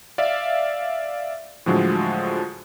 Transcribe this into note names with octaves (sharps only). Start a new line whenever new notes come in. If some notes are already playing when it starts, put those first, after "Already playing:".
D5 E5 F5
A2 D3 F3 F#3 G#3